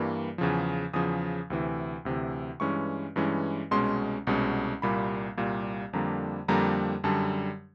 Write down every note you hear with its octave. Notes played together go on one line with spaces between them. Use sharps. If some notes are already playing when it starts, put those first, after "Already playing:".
Already playing: G2 E3 G3 A#3
E2 C#3 F3
E2 C#3 F3 D#6
D2 C3 E3
D2 C3 E3
G2 E3 G#3 C#4 C#6
G2 E3 G#3 C#4
C2 B2 G#3 C#4 C6
C2 B2 G#3 C#4
C2 A#2 G3 A#3 B5
C2 A#2 G3 A#3
F2 D3 G3 A#3 A#5
F2 D3 G3 A#3 A#5
F#2 D3 G3 A5